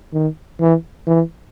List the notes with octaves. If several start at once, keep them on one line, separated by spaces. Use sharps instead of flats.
D#3
E3
E3